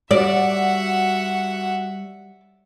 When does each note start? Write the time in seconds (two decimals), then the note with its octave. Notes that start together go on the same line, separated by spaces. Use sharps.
0.11 G3 F#4 D5 E5 F#5